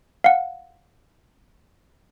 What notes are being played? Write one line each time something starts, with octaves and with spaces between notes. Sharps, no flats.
F5 F#5